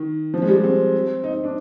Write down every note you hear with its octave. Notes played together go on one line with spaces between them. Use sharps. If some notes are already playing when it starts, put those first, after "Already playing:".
Already playing: D#3
F3
G#3
G3
C4
D#4
D#4
D4